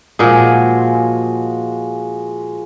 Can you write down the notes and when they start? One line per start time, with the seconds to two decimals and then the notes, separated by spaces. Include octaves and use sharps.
0.19 A#2 F3 G#3 F#4 G#4